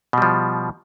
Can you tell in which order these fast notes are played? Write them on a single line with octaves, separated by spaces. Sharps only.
B2 G3 F3